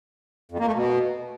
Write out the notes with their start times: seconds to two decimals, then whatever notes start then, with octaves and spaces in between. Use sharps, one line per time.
0.52 F2
0.59 A#3
0.67 A3
0.75 B2